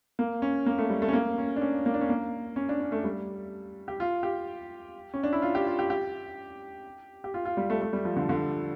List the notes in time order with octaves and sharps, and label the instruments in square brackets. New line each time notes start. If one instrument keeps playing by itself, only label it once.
[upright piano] A#3
C#4
A#3
A3
G3
A3
C#4
A#3
C#4
D4
C#4
A#3
D4
C#4
A#3
C#4
D4
C#4
A3
G3
G4
F4
G4
C#4
D4
E4
F4
G4
F4
G4
G4
G4
F4
F4
G3
A3
A3
G3
F3
D3
D3